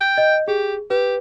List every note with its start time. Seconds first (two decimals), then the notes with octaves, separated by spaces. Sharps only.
0.01 G5
0.18 D#5 G6
0.48 G4 G#4
0.90 G4 B4